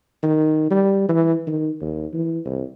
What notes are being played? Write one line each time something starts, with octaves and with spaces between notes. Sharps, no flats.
D#3
G3
E3
D#3
D#2
E3
C2